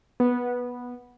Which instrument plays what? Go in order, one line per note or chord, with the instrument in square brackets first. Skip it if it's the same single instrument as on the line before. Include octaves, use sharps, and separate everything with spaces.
[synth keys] B3